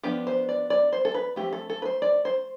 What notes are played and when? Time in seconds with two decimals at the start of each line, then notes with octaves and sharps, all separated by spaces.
0.03 F3 B3 D4 G4
0.27 C5
0.49 D5
0.70 D5
0.92 C5
1.05 A4
1.14 B4
1.36 F3 A3 C4 G4
1.53 A4
1.70 A4
1.82 B4
1.85 C5
2.02 D5
2.25 C5